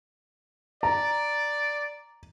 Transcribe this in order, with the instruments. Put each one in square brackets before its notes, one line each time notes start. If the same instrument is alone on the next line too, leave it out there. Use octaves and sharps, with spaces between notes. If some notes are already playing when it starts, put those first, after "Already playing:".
[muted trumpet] D5 [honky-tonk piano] A#5